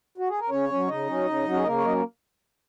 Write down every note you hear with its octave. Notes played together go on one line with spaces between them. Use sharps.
F#4
G#4
A#4
C#3 C#4 C#5
F#3 C#4
C#3 D#4 D#5
F#3 C#4
C#3
F#3 C#4 F#4
G#4
C#3 A#3 A#4
C#5
F#3 C#4 D#5